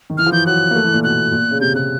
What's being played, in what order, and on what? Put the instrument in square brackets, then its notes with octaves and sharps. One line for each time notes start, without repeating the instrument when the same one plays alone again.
[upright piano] D#3
[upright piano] E3 [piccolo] F6
[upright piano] F3
[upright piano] E3 [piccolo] G6
[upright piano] F#3 [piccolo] F#6
[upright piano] A#3
A3
E3
A#2
[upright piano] B2 [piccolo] F#6
[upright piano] A#2
C#3
[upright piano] C3 [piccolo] G6
[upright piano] C3 [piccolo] F#6